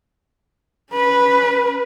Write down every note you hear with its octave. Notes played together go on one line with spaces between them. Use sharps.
C#4 B4